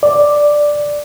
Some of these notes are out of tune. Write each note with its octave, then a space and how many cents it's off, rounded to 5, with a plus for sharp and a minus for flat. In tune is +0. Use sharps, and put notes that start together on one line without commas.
D5 +5